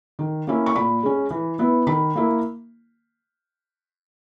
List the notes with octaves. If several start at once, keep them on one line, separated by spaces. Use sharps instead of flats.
D#3
A#3 C#4 E4
C#6
A#2 B5
G#3 C#4
E3
B3 E4
D#3 B5
A#3 E4